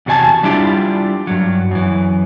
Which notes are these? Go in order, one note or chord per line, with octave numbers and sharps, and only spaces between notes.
E2 C3 F#4 D5 G#5 A5
G3 D4 E4 F4 G4
G2 F#3
F#2 E3